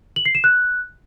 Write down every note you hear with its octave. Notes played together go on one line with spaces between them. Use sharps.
F#7
C7
E7
F#6